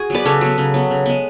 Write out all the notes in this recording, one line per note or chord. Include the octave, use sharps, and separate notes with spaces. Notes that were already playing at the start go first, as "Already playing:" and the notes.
Already playing: F#4 G#4
F#3 B3 B4 D5
C#3 A4 C#5
F#3 B3
C#3
F#3 B3
C#3
G#3 B3